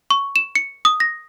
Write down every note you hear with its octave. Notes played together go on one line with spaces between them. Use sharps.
C#6
E7
C#7
D#6
A#6